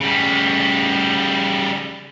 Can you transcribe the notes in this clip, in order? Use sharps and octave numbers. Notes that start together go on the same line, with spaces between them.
C#3 G3